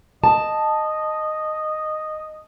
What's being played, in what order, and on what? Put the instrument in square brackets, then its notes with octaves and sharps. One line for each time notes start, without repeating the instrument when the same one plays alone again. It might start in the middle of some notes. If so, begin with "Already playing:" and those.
[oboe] D#5 [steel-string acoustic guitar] A5